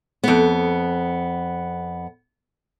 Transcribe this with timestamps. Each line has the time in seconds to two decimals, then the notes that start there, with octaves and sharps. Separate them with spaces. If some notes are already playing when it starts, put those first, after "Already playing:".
0.24 F2 B3